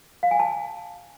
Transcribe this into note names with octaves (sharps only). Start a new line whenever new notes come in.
F5
G#5
A5